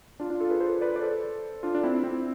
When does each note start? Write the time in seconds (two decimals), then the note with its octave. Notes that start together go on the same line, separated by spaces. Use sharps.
0.20 D4 F4
0.30 D4 F4
0.40 F4 A4
0.50 G#4 B4
0.60 A4 C5
0.81 B4 D5
0.96 D5
1.02 A4 C5
1.63 D4 F4
1.75 D4
1.83 C4 E4
2.04 C4 E4